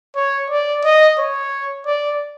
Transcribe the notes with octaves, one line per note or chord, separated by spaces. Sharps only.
C#5
D5
D#5
C#5
D5